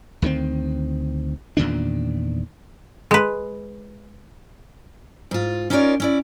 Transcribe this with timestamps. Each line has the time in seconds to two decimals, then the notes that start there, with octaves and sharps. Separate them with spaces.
0.22 D2 D#3 F3 C4
1.57 E2 A#2 D#3 D4
3.11 G#3 B4
5.31 G#2 F4
5.70 C#4 D#4 F4 A#4 C#5 D5
6.00 C#4 E4 D5